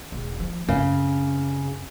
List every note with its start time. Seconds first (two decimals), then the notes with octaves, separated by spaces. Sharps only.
0.12 E1
0.40 F3
0.68 F#2 C#3 C4